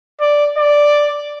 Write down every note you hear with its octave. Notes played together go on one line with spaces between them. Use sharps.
D5
D5